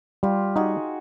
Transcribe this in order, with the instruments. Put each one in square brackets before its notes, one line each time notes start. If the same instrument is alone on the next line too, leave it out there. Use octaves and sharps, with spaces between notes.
[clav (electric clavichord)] G3 [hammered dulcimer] F4 G4
[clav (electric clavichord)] D#4 [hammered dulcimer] F#4 G#4